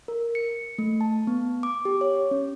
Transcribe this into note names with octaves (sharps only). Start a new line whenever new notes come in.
A#4
C#7
A3
A5
B3
D6
G4
C#5
C#4